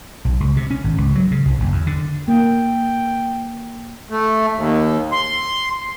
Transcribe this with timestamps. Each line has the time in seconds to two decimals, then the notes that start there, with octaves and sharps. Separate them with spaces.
0.25 B1
0.40 C#2
0.57 C3
0.70 C#4
0.84 G#1
0.98 C#2
1.15 F#3
1.31 C#3
1.46 C2
1.60 F#1
1.72 E2
1.87 D3
2.28 A#3 G5
4.10 A3
4.56 D#2
5.12 C6